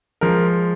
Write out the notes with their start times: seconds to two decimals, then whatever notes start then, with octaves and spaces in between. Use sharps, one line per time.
0.21 F3 G#3 A#4